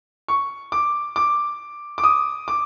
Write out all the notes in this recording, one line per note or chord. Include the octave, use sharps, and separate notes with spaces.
C#6
D6
D6
D6
D#6
D6